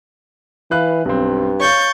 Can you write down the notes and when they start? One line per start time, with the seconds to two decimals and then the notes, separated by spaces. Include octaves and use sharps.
0.71 E3 B4 F5 F#6
1.05 B1 G2 C4
1.60 C#5 F5 C#6 G6 A6